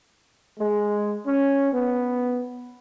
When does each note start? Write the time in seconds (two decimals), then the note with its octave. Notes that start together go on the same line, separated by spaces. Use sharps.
0.59 G#3
1.25 C#4
1.73 B3